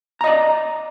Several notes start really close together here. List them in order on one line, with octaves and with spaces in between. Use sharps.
A#5 D#5 D5